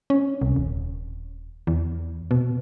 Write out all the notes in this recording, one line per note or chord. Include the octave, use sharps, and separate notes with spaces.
C#4
C2
D#1
E2
B2